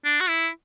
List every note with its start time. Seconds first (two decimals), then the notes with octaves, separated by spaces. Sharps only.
0.05 D4
0.21 F#4
0.29 E4